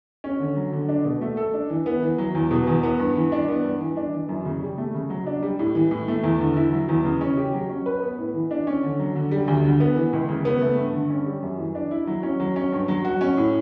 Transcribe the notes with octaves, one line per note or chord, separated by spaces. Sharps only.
C#4
D3
F#3
D3
D4
B2
A3
A4
D4
E3
B3
E3
F#3
E2
B2
E2
B3
G2
E3
D4
B3
G2
E3
D4
E3
F#2
C#3
G3
A3
C#3
F#3
D4
G3
A2
E3
A2
A3
E2
D3
E4
F#3
E2
C#3
C#4
G4
F#3
C#4
B4
B3
A2
E3
D4
C#4
D3
F#3
D3
G3
D2
D3
B3
E3
C#2
C#3
B3
A3
G2
D3
C#4
G3
F#2
E3
D4
E4
F#3
C#4
F#3
C#4
G2
F#3
F#4
C#4
A2